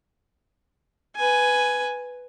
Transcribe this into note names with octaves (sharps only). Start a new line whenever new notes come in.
B4 G#5